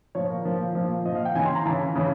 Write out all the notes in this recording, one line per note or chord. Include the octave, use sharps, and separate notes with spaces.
A#2 F3 C#5
A#4
A#2 F3
A#2 F3
A#2 F3 D#5
F5
G5
C#3 E3 G#5
C6
A#5
C#3 E3 A5
C#3 E3